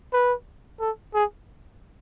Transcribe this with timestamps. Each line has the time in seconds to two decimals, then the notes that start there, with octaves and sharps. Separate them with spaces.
0.13 B4
0.80 A4
1.14 G#4